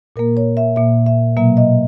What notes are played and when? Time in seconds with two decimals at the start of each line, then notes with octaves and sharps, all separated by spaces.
0.16 A#2 A#3 A#4
0.37 C#5
0.57 E5
0.76 A#2 A#3 E5
1.06 E5
1.37 B2 F#3 A#3 E5
1.57 D#5